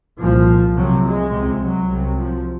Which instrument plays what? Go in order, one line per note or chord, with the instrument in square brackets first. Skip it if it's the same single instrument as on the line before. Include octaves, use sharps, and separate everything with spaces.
[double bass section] C2 A#2 F3
C2 C3 F#3
G#3
C#2 C3
F#3
C2 C3
F3